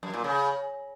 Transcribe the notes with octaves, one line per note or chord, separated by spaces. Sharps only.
F#2
A#2
C#3